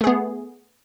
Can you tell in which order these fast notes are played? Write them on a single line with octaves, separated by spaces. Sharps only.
A3 G#4 B3